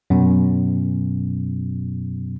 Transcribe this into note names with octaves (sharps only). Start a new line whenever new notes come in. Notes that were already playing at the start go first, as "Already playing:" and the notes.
F#2 B2